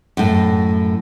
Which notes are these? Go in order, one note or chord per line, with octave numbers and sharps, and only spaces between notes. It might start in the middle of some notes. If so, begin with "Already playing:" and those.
F#2 A2